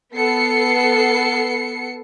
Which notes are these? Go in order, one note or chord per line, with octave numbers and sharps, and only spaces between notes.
B3 A4 C7 C#7